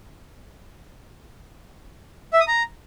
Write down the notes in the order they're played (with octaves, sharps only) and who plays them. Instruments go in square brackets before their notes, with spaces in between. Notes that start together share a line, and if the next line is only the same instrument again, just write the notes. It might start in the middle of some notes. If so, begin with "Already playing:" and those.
[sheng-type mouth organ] E5
D#6
A#5